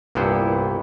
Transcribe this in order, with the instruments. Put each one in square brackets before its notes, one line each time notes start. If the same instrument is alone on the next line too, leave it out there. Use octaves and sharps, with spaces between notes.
[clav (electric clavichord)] C2 G2 A#2 B3 E4 C5